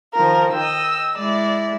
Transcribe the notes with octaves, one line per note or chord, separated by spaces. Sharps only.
D#3 F3 F4 A#4
D#5 G5 E6
G#3 E4 D5